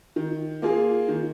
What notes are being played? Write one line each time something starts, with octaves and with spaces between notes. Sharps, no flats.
D#3
A#3 F4 G#4
D#3